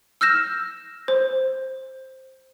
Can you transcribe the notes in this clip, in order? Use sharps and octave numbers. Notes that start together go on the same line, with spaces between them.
E6 F6 G6 A#6 E7
C5